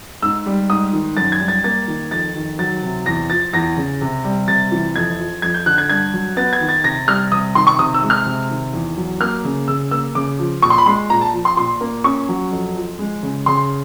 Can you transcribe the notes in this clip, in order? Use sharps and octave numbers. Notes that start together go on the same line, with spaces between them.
G#2 E6
G3
G#2 D#6
D#3
F#2 A6
G#6
G3
A6
A#3 A6
D#3
F2 A6
D#3
F#3 A6
C3
E2 A#6
F3 A6
E2 A#6
C#3
C3
G3
C3 A6
E3
F2 G#6
F3
F2 G#6
G6
D3 F#6
G#6
G2 G#6
F#3
B3 A6
G#6
D#3
A6
C3 A#6
G3 F6
C3 D#6
D#3 C6
C#6
C3 D#6
E6
G#3
F6
C3
D#3
E2
F#3
A#3 F6
C#3
C#3 E6
A#3 E6
C#3 D6
F3
A#2 C#6
C6
B5
G#3 C6
A#2 A#5
A5
F3
C6
A#2 C6
A#3
C#4 C#6
F#3
F2
F3
G#3
C#3
C#3 C6